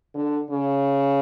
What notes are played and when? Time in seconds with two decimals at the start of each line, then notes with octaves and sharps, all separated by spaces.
0.15 D3
0.50 C#3